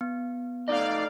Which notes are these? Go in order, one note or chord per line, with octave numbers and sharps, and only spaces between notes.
B3
A3 D#4 D5 D#5 F5